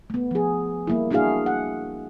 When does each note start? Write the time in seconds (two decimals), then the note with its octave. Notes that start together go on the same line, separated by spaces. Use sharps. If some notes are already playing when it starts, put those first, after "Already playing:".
0.10 A3 B3
0.31 F3 G#4
0.87 G3 A#3 E4
1.11 A#3 D4 E4 F#4 G#4 F5
1.46 F#5